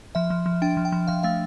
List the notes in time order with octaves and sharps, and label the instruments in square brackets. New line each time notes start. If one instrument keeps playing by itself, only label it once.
[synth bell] F3 E5
F3
F3
D4 G5
F3
G5
F3
F3 F5
A3 F5